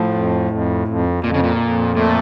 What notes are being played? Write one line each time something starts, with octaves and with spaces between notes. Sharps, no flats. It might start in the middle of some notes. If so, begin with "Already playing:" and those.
Already playing: A2 F3
F2
F2
F2
F2 A#2
C#3
A#2
F2
A#2 A3